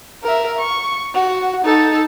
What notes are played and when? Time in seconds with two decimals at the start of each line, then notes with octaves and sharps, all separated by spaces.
0.24 A#4 E5
0.59 C#6
1.15 F#4
1.65 D#4 A4